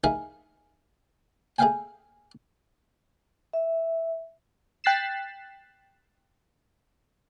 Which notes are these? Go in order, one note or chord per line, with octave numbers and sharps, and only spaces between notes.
D#4 E4 G#4 A#4 E5 F5
G#4 A4 E5 F5 G5 G#5
E5
G5 F#6 A6 B6 C7 E7